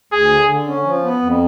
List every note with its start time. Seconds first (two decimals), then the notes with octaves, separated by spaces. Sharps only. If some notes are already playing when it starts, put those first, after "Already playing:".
0.12 D2 G#4
0.31 D3
0.49 D3
0.67 C#4
0.85 F3
1.04 B3
1.22 F2